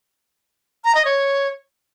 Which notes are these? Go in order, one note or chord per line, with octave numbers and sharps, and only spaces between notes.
A#5
D#5
C#5